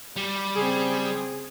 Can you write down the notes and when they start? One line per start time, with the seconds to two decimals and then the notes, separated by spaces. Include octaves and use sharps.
0.16 G3
0.55 C#3 C4 G#4